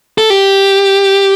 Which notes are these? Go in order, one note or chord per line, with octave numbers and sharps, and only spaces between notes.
A4
G4